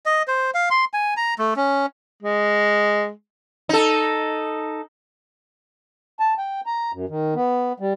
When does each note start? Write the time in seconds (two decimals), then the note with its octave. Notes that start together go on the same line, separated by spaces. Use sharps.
0.06 D#5
0.28 C5
0.54 F5
0.70 C6
0.94 G#5
1.17 A#5
1.39 A3
1.56 C#4
2.23 G#3
3.69 D#4 A4
6.20 A5
6.38 G5
6.66 A#5
6.93 F#2
7.09 D#3
7.35 B3
7.80 G3